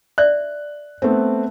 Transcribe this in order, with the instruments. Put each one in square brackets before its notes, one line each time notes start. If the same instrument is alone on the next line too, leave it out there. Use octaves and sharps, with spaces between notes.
[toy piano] D5 E5 [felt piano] F#6
[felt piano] A3 B3 C4